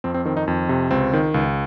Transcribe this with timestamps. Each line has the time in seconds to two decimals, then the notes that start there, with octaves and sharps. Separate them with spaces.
0.04 F2 C4
0.14 C4
0.25 D#3 C4
0.37 D#4
0.47 F2
0.69 C3
0.91 C#2 C4
1.13 D#3
1.34 C#2